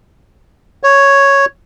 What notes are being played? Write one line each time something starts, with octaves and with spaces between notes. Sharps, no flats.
C#5